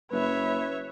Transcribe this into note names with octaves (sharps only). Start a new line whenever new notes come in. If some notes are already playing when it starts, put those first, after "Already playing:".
F#1 B4 C#5 E5